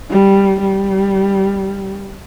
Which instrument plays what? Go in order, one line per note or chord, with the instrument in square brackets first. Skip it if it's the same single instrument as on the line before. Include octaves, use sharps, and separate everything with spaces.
[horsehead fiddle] G3
G3